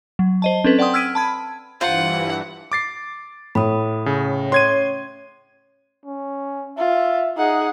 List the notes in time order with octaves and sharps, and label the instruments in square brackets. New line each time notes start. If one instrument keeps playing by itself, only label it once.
[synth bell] F#3
C5 D#5 A5
C4 C#4 A4 B4
D5 F#5 G5 C6 D#6
E6 F6 G#6 B6 D7 D#7
A5 B5 G#6
[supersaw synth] G2 E3 [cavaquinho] F4 C5 [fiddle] F#5
[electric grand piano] D6 A6 C7
[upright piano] A2 [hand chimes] B5 D#6
[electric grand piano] C#3
[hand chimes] C#4 C#5 [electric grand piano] C6 G#6 D#7
[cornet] C#4
[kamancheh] F4 [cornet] E5
[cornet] D#4 [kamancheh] G#4 F#5